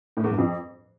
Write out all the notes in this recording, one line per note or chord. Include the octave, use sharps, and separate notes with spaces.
A2
E2
G2
F2